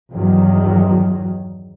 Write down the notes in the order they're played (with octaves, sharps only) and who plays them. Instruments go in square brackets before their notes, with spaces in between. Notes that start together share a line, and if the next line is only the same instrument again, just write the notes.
[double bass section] E2 G2 D#3 F#3